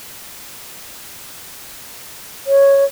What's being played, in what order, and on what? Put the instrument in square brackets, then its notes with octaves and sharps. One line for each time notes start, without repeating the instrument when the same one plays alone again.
[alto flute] C#5